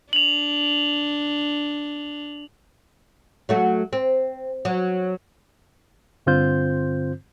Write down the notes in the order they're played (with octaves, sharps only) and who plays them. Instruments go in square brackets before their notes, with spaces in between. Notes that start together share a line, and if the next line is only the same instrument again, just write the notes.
[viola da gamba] D4 [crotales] F7 F#7
[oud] F#3 A3 F#4
C4
F#3
[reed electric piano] G2 D3 C4 F4 C5 G6